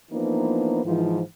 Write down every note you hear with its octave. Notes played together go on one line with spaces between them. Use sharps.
E3 F3 A#3 B3 D4 D#4
G#2 E3 F3